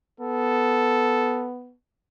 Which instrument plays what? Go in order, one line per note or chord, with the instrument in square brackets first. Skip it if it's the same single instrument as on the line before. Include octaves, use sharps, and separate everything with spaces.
[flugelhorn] B3 [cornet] A4